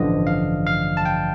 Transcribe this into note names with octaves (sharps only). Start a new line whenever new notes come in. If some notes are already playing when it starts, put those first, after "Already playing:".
Already playing: A1 G2 D3 F3 D#5
F5
F5
A5
G5